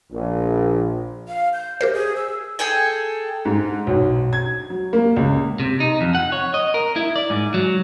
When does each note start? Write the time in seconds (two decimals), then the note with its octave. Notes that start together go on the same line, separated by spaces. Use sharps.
0.12 A#1
1.28 F5
1.53 G6
1.81 G4 A#4 C5 G6
1.94 G#4
2.16 E6
2.59 G#4 A4 G5 G#5
3.45 G#2
3.87 B1
4.33 G#6
4.70 F#3
4.93 A#3
5.16 C#2
5.60 C3
5.80 D#4
6.01 F2
6.15 F#5
6.32 C#5
6.54 D#5
6.74 A#4
6.96 E4
7.16 D5
7.30 G#2
7.54 F#3